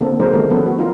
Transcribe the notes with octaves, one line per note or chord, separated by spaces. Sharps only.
D3 A#3 C4 A4
F#3 G#3 D#4 A#4 C5
D3 D#3 F#3 G3 A3 B3
F3 F#3 B3 C#4 A4 B4
F#4
D#4 F4 A#4